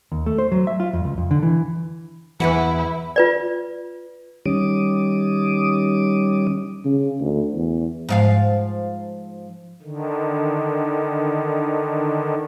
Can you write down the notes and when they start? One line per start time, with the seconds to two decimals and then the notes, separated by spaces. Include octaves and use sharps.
0.12 D#2
0.26 A3
0.38 C5
0.52 F#3
0.67 E5
0.80 F4
0.93 F2
1.05 C#2
1.18 F2
1.31 D3
1.43 E3
2.40 E2 E3 E4 B4 F#5
3.16 F4 B4 D5
4.46 D#3 G3 C#4 D6 D#6
6.85 C#3
7.20 D2
7.54 E2
8.09 G#2 F3 F5
9.82 D3 D#3